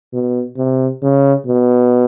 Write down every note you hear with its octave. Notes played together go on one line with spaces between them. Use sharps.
B2
C3
C#3
B2